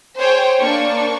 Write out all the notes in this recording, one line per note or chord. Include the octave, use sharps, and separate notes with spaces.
G#4 C5 C#5 G5
A#3 D4 C#6